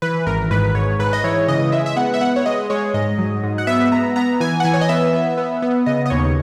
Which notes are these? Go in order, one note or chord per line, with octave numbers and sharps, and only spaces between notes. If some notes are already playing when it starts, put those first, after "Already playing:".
E3 B4
G#1 A#4
G#2 B4
G#2 C#5
G#2 B4
D#5
E3 C#5
C#3 D#5
G#3 E5
E5
B3 F#5
E5
B3 F#5
C#5
G#3 D#5
G#3 C#5
G#2 D#5
F#3
G#2
F#5
B3 E5
B3 A#5
B3 A#5
E3 G#5
F#5
E3 G#5
C#5
D#5
B3 E5
B3
B3
B3
C#3 D#5
D#5
D#2 C#5